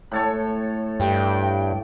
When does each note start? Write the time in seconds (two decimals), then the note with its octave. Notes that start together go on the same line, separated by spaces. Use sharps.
0.11 A2 A4 C#5
1.00 G2 G5